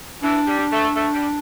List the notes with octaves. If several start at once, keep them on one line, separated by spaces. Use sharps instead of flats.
E3 D4
G3
D4
A3
A3
G3